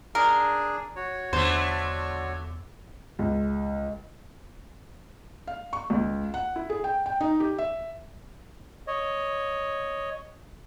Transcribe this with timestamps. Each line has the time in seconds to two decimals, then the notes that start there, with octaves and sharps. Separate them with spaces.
0.15 D4 G#4 A#4
0.96 F#4 C#5
1.33 E2 D3 A3 C5
3.19 C#2
5.47 F5
5.73 C#6
5.90 C#2
6.34 F#5
6.56 E4
6.70 G#4
6.84 G5
7.06 G5
7.21 D#4
7.40 G4
7.58 E5
8.87 C#5 D#5